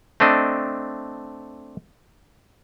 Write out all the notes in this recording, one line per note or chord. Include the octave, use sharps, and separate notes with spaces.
A3 C4 D4 D#5